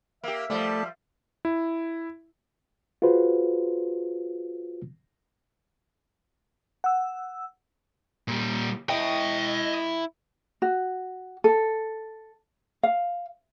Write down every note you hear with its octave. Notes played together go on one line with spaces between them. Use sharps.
A#3 G4 E5
F3 G3 A3 D5 A5
E4
F4 F#4 G#4 B4 C5
F#5 E6
A#2 G3
E4 D#5 G5
F#4
A4
F5